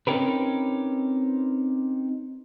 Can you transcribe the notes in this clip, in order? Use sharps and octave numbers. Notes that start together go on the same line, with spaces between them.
C4 C#4 D#4 G4 A#4 B4